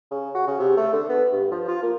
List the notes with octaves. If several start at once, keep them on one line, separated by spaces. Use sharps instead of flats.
C#3
F#4
C#3
C3
A3
D3
B3
G2
F3
F4
A#3